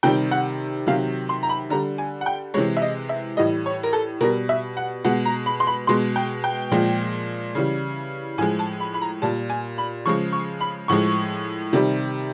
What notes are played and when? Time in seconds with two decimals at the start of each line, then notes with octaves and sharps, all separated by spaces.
0.03 C3 D#3 G3 G5
0.31 F#5
0.87 C3 D#3 F#3 F5
1.29 C6
1.43 A#5
1.49 B5
1.70 D3 G3 A#5
1.98 G#5
2.21 F#5
2.26 G5
2.54 C3 E3 G#3 C#5
2.77 E5
2.82 D#5
3.09 E5
3.37 A2 E3 G3 D#5
3.66 C#5
3.83 A#4
3.93 A4
4.21 B2 G3 A#4
4.49 E5
4.77 F#5
5.04 B2 G#3 F#5
5.25 A#5
5.46 B5
5.60 C6
5.67 B5
5.87 B2 G#3 C6
6.16 G5
6.44 G5
6.71 A#2 F3 G#3
7.55 C#3 E3 G3
8.38 A2 F3 G#3 G#5
8.59 A5
8.80 B5
8.94 B5
9.02 A#5
9.22 A#2 G3 A5
9.50 G#5
9.78 B5
10.06 C#3 F3 G#3 C#6
10.33 C#6
10.61 B5
10.88 A2 F3 G#3 C#6
11.73 C3 D#3 G3